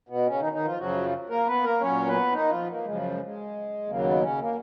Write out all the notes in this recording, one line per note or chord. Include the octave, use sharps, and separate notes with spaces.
B2 B3
C#3 C#4
D#3 D#4
D#3 D#4
F3 F4
F#2 C#3 F3 F#3 F#4
A#3 A#4
B3 B4
A#3 A#4
A#2 F#3 C#4 C#5
B3 B4
D#3 D#4
F3 F4
A#3
F#2 C#3 F3 G#3
G#3
G#3
D#2 C#3 F#3 A#3
B2 B3
C#3 C#4
A#3